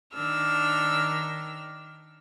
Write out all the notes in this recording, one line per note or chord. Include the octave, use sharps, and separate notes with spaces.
D#3 D4 E6 F6